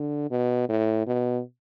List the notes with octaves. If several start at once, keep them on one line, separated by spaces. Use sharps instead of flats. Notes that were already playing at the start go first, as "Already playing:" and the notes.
Already playing: D3
B2
A2
B2